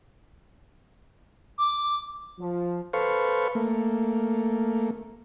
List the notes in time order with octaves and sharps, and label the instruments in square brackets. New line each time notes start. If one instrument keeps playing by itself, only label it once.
[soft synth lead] D6
[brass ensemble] F3
[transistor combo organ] A4 B4 C5 F5 C#6
A3 A#3